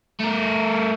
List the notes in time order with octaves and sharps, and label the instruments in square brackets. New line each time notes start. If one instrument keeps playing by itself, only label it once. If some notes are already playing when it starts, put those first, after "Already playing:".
[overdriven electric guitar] A3 A#4